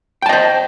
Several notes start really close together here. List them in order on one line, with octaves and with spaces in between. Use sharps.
G5 A5 D#5 C5